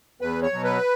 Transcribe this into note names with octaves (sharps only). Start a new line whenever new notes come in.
E2 B4
C#5
B2 F#3
B4